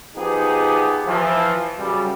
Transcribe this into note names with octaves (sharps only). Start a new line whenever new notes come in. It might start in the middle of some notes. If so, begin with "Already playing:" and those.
F3 B3 D#4 G4 G#4
E3 F3
F#2 C#3 G3